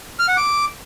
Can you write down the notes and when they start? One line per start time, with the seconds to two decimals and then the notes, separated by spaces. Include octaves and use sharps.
0.19 F6
0.28 F#5
0.37 D6